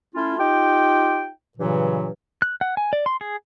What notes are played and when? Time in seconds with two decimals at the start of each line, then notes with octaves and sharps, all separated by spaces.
0.14 A3 C#4 E4 F4
0.38 D#4 F4 G4 G5
1.57 G2 A#2 C#3 E3 F#3
2.42 F#6
2.61 F#5
2.77 G#5
2.93 D5
3.06 C6
3.21 G#4